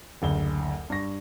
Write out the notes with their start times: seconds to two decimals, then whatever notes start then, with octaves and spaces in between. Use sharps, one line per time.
0.22 F#1 D2 G7
0.90 G2 C#6 A#6